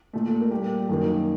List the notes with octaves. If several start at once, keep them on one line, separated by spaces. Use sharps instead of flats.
A#2 A3
A4
A#4
A#2 G3 A#3 G4
F#2 D#3 F#3 A#3